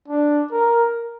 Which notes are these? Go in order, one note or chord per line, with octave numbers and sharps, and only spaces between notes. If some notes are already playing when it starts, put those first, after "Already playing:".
D4
A#4